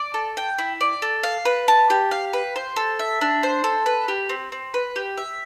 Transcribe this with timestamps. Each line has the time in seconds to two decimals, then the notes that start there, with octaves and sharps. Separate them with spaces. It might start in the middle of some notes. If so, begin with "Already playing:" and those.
Already playing: D5
0.14 A4
0.37 G5
0.59 E4
0.81 D5
1.02 A4
1.23 F5
1.45 B4
1.68 A5
1.90 G4
2.11 F5
2.33 B4
2.56 C5
2.76 A4
2.99 E5
3.21 D4
3.43 C5
3.64 A4
3.86 B4
4.08 G4
4.29 C4
4.52 C4
4.74 B4
4.96 G4
5.17 E5